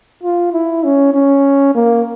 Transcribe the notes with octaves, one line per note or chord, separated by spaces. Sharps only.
F4
E4
C#4
C#4
A#3